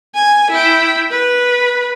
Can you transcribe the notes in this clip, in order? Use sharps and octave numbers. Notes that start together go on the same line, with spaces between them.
G#5
E4 G5
B4